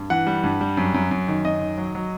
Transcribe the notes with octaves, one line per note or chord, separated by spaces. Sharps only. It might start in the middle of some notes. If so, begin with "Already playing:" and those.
Already playing: G2
E3 F#5
G3
G2
G3
F#2
F#2
F#2
D#3
F#2 D#5
D#3
F#3
F#3